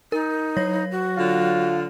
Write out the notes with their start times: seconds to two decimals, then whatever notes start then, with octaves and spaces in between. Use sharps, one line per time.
0.12 D#4 A#4
0.57 F#3 C#5 A#6
0.91 F#4
1.18 D3 F4